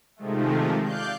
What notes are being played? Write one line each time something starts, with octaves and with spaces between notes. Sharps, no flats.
C3 D#3 F3 G#3 A3
D5 F5 F#6 G6